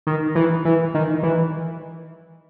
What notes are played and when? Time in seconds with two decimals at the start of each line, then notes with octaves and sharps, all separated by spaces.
0.07 D#3
0.35 E3
0.65 E3
0.94 D#3
1.23 E3